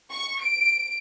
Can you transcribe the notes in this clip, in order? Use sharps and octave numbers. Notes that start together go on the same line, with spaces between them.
C#6
D7